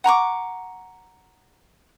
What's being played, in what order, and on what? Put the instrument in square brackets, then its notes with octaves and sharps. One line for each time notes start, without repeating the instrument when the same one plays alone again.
[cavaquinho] F#5 A#5 C#6 D6